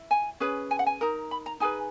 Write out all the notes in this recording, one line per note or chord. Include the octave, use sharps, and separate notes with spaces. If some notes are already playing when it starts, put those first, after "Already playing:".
Already playing: E4
G#5
C#4 G#4 B4
G#5
F#5
G#5
D#4 A#4
B5
A#5
D#4 G#4 B4 G#5